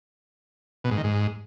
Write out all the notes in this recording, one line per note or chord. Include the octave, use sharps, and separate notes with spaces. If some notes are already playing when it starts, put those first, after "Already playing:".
B2
G#2
D#3
G#2